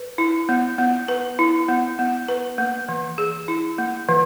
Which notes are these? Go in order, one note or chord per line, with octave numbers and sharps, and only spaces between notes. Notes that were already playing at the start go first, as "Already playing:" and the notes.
Already playing: B4
E4
B3
B3
B4
E4
B3
B3
B4
A#3
E3
G#4
E4
A#3
E3